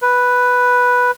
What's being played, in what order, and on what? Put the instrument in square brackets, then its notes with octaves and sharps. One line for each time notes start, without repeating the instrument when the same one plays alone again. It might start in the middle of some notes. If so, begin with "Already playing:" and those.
[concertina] B4